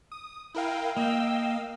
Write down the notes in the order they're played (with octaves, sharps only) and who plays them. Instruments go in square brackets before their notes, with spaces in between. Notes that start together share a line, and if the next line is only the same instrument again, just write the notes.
[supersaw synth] D#6
[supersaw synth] E4 A#4 F5 [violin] G5 G#5
[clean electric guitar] A#3 [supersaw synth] D#5 F5 [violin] G5 E6